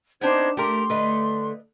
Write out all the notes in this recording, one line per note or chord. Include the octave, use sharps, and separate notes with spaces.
B3 C4 D4 D#4 C5 G#6
A3 G4 A#4 C6
D3 A3 B4 D#5